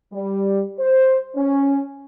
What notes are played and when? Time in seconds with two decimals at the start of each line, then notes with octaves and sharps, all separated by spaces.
0.13 G3
0.79 C5
1.36 C#4